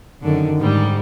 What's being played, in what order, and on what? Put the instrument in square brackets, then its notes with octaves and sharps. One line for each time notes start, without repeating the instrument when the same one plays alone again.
[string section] F#2 D3 [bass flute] D#3
[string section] G#2 G3